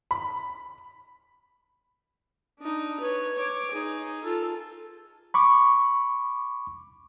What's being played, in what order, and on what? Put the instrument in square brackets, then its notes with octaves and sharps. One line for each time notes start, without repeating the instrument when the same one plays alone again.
[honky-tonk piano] B5
[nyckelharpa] D4 D#4
B4 C#5
C#5 D6
D#4 G#4
F4 A4
[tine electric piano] B5 C#6 D6